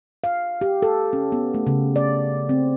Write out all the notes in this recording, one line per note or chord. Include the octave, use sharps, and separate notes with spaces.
F5
G4
A4
C#4
B3
A3
C#3
D5
C4